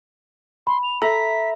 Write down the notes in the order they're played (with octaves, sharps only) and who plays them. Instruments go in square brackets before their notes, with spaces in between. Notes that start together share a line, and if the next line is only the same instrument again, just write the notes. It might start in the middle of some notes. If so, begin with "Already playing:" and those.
[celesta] B5 [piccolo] C6
[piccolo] F7
[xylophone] A4 [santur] E5 A#5 [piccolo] B6